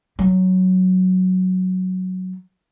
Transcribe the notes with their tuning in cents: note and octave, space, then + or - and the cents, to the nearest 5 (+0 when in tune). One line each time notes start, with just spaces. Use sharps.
F#3 +0